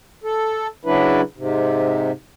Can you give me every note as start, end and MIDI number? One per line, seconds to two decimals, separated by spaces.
0.24 0.67 69
0.85 1.21 49
0.85 1.21 54
0.85 1.21 62
0.85 1.21 64
0.85 1.21 71
1.37 2.11 44
1.37 2.11 48